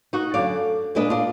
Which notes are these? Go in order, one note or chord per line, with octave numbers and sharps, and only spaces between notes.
D#4 F#4
F#2 D3 F#3 D5 F5
A#2 G#3 D4 B4 D#5
D4 F4